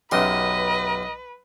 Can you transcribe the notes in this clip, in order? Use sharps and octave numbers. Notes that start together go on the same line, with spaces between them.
B1 F#2 G4 B4 D#5 C6